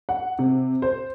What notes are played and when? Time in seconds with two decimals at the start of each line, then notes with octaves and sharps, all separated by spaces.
0.09 F#5
0.39 C3
0.82 C5